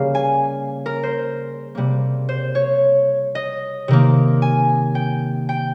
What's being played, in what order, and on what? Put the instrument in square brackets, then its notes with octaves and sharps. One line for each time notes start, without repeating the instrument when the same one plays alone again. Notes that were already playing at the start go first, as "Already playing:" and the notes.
Already playing: [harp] C#3 G3 A#3 F5
G#5
A#4
C5
C3 G3 A#3
C5
C#5
D#5
C3 D#3 A#3
G#5
G5
G5